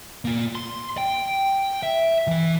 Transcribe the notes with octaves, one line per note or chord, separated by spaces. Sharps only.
A#3 F4
C6
G5
E5
E3 E4